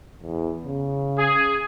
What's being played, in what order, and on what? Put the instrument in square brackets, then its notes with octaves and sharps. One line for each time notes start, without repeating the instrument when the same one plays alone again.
[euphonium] E2
C#3
[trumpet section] G#4